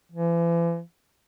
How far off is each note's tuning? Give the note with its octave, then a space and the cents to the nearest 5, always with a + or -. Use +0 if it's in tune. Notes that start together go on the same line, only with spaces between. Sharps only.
E3 +40